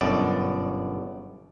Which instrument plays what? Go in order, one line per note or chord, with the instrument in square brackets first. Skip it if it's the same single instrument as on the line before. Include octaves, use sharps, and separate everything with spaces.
[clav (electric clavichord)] G1 F#2 B2 D5